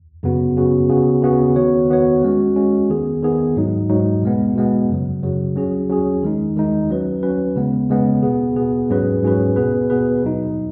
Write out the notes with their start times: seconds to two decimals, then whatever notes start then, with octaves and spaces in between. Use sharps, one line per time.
0.23 F#2 C#3 B3 F#4
0.56 F#2 C#3 B3 F#4
0.89 C#3 B3 F#4
1.23 C#3 B3 F#4
1.56 D#3 B3 F#4 C#5
1.89 D#3 B3 F#4 C#5
2.23 G#3 C#4 F#4
2.56 G#3 C#4 F#4
2.90 D#3 B3 G#4
3.23 D#3 B3 G#4
3.56 G#2 F#3 D#4
3.89 G#2 F#3 D#4
4.23 B2 G#3 B3
4.56 B2 G#3 B3
4.89 F#2 C#3 F#3
5.23 F#2 C#3 F#3
5.56 F#3 C#4 G#4
5.89 F#3 C#4 G#4
6.23 D#3 G#3 D#4
6.56 D#3 G#3 D#4
6.90 F#3 C#4 B4
7.23 F#3 C#4 B4
7.56 C#3 G#3 B3
7.90 C#3 G#3 B3
8.23 B2 B3 G#4
8.56 B2 B3 G#4
8.90 G#2 F#3 C#4 G#4 B4
9.23 G#2 F#3 C#4 G#4 B4
9.56 B2 B3 G#4 B4
9.90 B2 B3 G#4 B4
10.23 B2 F#3 D#4